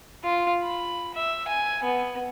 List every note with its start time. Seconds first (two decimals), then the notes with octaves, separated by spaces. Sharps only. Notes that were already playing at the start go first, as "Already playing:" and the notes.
0.24 F4
0.63 B5
1.14 E5
1.48 G#5
1.83 B3